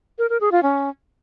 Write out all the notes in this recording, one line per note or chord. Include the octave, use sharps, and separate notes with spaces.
A#4
A#4
G#4
F4
C#4